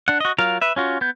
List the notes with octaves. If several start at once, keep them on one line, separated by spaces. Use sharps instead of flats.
D4 F#5
F#4 D#5
F#3 F4 A#4 F5
B4 E5
C#4 F4 F#4
B3 G6